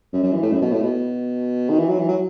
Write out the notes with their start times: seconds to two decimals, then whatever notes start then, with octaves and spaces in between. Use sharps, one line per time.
0.13 F#2
0.23 F#2
0.33 E3
0.43 A2
0.53 F#2
0.62 B2
0.72 A2
0.82 B2
1.69 D#3
1.79 E3
1.89 F#3
1.99 E3
2.09 F#3